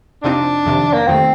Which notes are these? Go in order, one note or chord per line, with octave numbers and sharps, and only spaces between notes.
F2 C3 F3 C4 D4 D#4
F2 C3 D#3
A#3
F2 C3 D#3 A3 C4